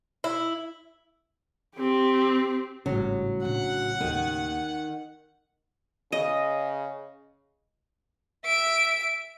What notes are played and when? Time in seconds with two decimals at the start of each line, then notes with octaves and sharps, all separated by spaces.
0.24 E4
1.76 C4 G4
2.86 G#1 A2 C#3 F#3 G3
3.45 A#1 F#5
4.01 D#2 D#3 A#3
6.12 C#3 D#5
8.45 E5 D7